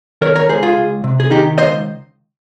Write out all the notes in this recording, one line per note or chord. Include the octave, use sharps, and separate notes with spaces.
D#3 A#4 C#5
A#4 C#5
C#2 G#4 C5
F4 G#4
C#2
C3
G#4
D#3 D#4 G4
C#2 C5 D#5